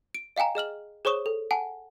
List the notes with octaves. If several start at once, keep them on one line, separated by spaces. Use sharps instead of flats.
D7
D#5 F5 G5 G#5 A#5
G#4 D#5 F6 F#7
G#4 C5 C#5 C#6 D#6 E7
A4
F#5 G#5 A5